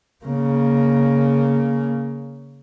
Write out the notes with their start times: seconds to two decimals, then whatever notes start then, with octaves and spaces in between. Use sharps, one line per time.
0.25 C#3 A#3